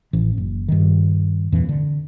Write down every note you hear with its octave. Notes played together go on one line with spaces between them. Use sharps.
A1 E3
F#1
G2 D#3
E1 F2 A#2 E3
D3